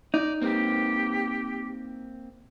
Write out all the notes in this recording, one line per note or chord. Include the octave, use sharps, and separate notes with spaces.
D#4 D5
A#3 C4 G4